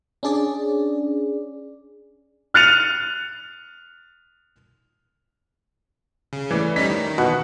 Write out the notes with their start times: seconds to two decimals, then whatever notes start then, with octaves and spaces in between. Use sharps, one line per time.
0.23 C#4 D4 G#4 D5
2.54 F6 F#6 A6 C#7 D#7 F7
6.33 C#3
6.51 E3 A3 B4 D5
6.76 G3 C#4 D#4 B6
6.90 D#3
7.18 B2 E3 F#4